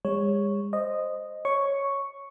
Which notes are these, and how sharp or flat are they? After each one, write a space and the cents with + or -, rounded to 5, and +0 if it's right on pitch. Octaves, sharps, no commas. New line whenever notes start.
G#3 -45 C#5 +0
C5 +0 D#5 -10
C#5 +0 C#6 +0